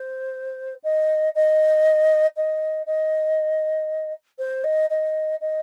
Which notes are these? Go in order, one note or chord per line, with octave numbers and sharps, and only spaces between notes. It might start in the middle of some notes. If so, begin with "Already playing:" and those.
Already playing: C5
D#5
D#5
D#5
D#5
C5
D#5
D#5
D#5